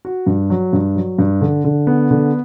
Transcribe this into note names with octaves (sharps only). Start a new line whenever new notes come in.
F#4
G2
F#3
G2
F#3
G2
D3
D3
B3
D3